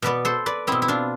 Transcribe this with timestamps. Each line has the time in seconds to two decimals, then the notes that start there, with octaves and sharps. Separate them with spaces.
0.02 B2 B3 B4 D5
0.25 A4 C5
0.46 B4 D5
0.67 B2 B3 C4 E4
0.82 E4
0.88 D4 F4